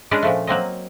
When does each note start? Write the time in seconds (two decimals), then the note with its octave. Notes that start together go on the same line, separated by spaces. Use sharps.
0.11 G#3 C#4 D4 G#4 B4 D#5
0.23 A#2 F3 A3
0.47 F#3 A#3 C4 D#5